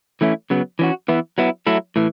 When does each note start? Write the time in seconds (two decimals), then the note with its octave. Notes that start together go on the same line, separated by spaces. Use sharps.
0.21 E3 A3 C#4 E4
0.50 C#3 F#3 B3
0.79 E3 C#4 F#4
1.08 E3 B3 E4
1.38 F#3 B3 E4
1.67 F#3 A3 E4
1.96 A2 E3